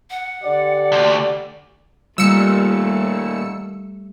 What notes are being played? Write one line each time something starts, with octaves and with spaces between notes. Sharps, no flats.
F#5
D3 G4 D5
D2
A#2 D#3 G3 A3 E6 C#7